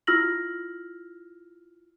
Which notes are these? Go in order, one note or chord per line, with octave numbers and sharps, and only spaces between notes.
E4 F4 E6 F6 A#6 F#7